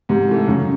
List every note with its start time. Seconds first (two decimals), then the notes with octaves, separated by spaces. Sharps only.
0.09 G#2 C3
0.29 E3 A3
0.48 F#2 C#3